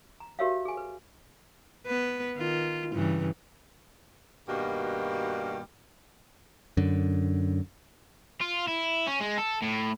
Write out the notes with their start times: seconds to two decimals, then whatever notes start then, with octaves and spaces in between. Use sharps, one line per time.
0.20 A#5
0.39 F#4 G4 A#4 C#5 E5 F5
0.65 G#4 G#5
0.77 B4
1.86 B3 B4
2.37 D#3 F4
2.95 G2 C#3 E3
4.47 G2 B2 D#3 G3 A#3 F#4
6.77 F#2 D3
8.41 F4
8.67 E4
9.07 C#4
9.20 G#3
9.38 A4
9.62 A2